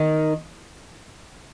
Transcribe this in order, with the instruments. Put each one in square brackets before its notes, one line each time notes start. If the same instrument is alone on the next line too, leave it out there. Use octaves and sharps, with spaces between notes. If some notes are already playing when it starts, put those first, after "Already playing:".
Already playing: [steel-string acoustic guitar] D#3